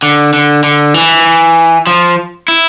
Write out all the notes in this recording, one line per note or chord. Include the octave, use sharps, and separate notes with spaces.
D3
D3
D3
E3
F3
E4